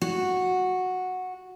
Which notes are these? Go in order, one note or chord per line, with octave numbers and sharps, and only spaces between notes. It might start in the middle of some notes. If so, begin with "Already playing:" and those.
F#4